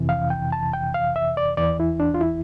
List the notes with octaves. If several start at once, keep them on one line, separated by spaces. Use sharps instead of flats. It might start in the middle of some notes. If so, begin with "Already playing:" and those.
Already playing: F2 C3 E3
F5
G5
A5
G5
F5
E5
D5
E2 E3 D5
E4
D4
F4
E4